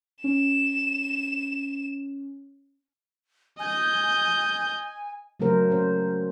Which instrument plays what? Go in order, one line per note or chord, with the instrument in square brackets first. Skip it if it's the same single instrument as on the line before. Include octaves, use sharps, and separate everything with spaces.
[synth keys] C#4 [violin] E7
[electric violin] D#5 G6 [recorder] G#5
[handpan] C#3 F#3 A3 C#4 A#4 C5
C#4 C5